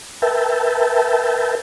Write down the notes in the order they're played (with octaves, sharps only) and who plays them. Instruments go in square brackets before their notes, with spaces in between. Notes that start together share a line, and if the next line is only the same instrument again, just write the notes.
[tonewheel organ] A#4 B4 E5 G5 A5